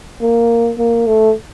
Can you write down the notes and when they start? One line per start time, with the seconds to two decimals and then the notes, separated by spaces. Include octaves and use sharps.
0.21 A#3
0.78 A#3
1.07 A3